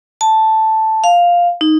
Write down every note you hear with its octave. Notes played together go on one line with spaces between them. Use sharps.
A5
F5
D#4